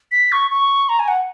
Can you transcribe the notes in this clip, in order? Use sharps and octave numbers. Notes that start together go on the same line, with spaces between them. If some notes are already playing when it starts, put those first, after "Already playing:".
B6
C#6
C#6
A#5
G#5
F#5